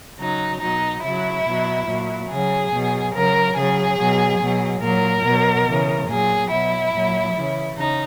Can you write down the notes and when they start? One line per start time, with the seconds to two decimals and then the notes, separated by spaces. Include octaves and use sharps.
0.18 C#3 F#3 D#4
0.60 B2 F#3 D#4
1.02 C#3 F#3 E4
1.44 B2 F#3
1.87 A#2 F#3
2.29 C#3 F#3 G#4
2.71 B2 F#3
3.13 C#3 F#3 A#4
3.55 C#3 F#3 G#4
3.97 B2 F#3
4.39 B2 F#3
4.81 A#2 F#3 A#4
5.24 B2 F#3
5.65 C#3 E3
6.07 A#2 F#3 G#4
6.50 B2 F#3 E4
6.92 A#2 F#3
7.34 C#3 E3
7.76 C#3 D#4